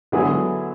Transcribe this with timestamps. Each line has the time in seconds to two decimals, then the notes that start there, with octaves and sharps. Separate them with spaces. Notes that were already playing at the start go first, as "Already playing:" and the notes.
0.12 D3 F#3 B3 E4 G#4